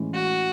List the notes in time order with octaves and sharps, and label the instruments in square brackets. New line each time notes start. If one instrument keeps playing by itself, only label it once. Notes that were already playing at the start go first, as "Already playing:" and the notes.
Already playing: [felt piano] A2 E3 G#3 C#4
[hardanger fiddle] F#4